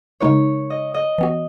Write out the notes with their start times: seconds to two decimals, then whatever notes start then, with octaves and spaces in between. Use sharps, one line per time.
0.20 C#3 G#3 D#4 A#4 C#5
0.70 D#5
0.94 D#5
1.18 E3 B3 F#4